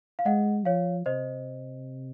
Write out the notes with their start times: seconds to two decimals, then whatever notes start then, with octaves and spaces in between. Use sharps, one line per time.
0.19 F5
0.25 G#3 D#5 F#5
0.65 F3 C#5 F5
1.06 C3 C5 D#5